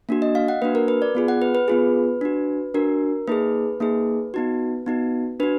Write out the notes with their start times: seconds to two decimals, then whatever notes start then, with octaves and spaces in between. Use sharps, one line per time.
0.09 A#3 D4 F#4
0.22 D#5
0.35 F5
0.48 F#5
0.62 A#3 D4 F#4 B4
0.75 A#4
0.88 B4
1.02 D5
1.15 B3 F4 G#4
1.28 F#5
1.42 B4
1.55 B4
1.68 B3 F4 G#4 B4
2.21 D4 F#4
2.74 D4 F#4 A#4
3.27 A#3 D#4 G#4 B4
3.80 A#3 D#4 G#4
4.34 B3 D#4 F#4
4.86 B3 D#4 F#4
5.40 D4 F#4 B4